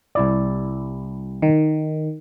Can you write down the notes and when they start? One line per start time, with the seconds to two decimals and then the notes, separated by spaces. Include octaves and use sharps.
0.15 C2 E4 D5
1.42 D#3